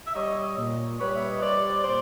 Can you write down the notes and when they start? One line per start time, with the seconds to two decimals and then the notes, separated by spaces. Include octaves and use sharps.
0.05 E5
0.14 G3 C#5 D#5
0.57 A#2
0.98 G3 B4 C#5
1.15 E5
1.28 D#5
1.41 G3 C5 D5
1.83 A#2 C5 D5